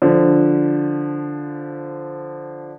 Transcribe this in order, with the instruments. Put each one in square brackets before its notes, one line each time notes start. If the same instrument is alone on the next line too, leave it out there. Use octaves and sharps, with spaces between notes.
[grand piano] D3 F3